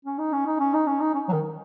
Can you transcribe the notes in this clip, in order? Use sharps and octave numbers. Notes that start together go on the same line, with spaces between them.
C#4
D#4
C#4
D#4
C#4
D#4
C#4
D#4
C#4
F#3
D#3